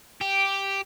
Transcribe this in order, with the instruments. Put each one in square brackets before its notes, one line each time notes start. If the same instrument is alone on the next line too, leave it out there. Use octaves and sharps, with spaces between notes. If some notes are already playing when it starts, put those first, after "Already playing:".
[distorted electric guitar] G4